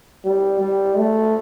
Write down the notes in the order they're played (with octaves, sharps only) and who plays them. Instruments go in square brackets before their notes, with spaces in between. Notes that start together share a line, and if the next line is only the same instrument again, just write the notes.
[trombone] G3
G3
A3